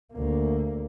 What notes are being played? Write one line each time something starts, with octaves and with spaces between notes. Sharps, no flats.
D2 A#3